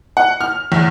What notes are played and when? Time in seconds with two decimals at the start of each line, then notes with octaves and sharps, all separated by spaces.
0.17 F#5
0.41 F6
0.72 E2